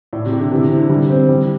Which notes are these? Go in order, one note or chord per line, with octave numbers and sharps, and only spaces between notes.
A2 D5
C3
G4
D3
C3 E3
C3
C4
D3
D3 G3
C4
G3